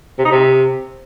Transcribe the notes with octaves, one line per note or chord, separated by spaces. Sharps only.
C3
D#4
C3